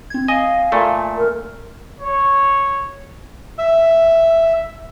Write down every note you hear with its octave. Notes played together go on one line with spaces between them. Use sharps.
C4 G#6
D#5 F5 G#5
A#2 A3
A#4
C#5
E5